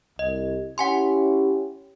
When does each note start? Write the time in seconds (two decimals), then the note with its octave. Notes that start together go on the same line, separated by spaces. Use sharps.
0.19 C2 D#5
0.78 C#4 E4 G4 F#5 G#5 C6